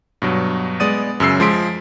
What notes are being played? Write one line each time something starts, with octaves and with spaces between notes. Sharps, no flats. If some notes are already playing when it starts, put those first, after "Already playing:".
G2 B2 F#3
G#3 B3 D5 D#6 A6 D#7
F#2 C#3 E6 C7
F3 G#3 C6 B6 D7